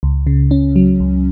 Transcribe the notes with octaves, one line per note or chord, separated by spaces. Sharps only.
C#2
C#3
C#4
F#3
C#2